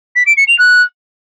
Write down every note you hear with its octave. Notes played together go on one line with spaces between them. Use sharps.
B6
D7
C#7
F7
F#6